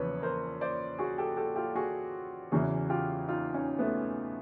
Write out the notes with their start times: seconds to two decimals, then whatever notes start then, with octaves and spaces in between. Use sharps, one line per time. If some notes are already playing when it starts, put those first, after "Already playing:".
Already playing: E2 C#3 F3 B4 C#5
0.22 A#4 C5
0.61 C5 D5
0.98 F#4 G#4
1.18 G4 A4
1.37 G4 A4
1.56 F4 G4
1.76 F#4 G#4
2.52 E2 C#3 E3 F#4 G#4
2.90 F4 G4
3.28 D#4 F4
3.54 C#4 D#4
3.79 A3 B3